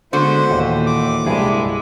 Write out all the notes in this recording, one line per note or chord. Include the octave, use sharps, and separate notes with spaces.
D3 G#3 B3 F#4 C5
D#2 A#2 E3
D6
C2 G2 G#3 E4 G#4